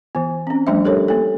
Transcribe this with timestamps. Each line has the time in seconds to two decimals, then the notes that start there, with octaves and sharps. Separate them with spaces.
0.15 E3 B3
0.47 C4 C#4
0.67 F3 G3 A3 D4 C5 E5
0.85 G4 A4 A#4 C#5
1.08 A#3 A4